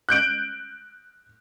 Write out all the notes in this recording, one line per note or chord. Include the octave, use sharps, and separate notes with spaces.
F#6 G6 D7